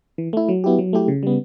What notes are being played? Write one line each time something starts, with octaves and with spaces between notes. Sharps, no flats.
E3
A3 E4
F#3
B3 E4 G4
F#3
A3 E4 G4
C#3
G3 B3